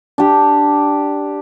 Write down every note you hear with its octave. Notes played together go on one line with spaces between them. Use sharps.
D4 G4